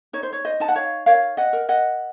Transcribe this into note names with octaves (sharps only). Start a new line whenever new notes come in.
D#4 C#5
C5
C#5
C5 D#5
D#4 A5
F#5
C#5 F5
A#4 C#5 F5
D#5 F#5
A#4
D#5 F#5